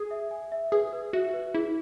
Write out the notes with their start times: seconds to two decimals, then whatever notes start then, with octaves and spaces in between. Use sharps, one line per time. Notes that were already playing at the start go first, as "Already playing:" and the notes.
Already playing: G#4
0.11 E5
0.31 G#5
0.52 E5
0.72 G#4 B4
0.93 B4
1.13 F#4 E5
1.33 B4
1.55 E4 G#4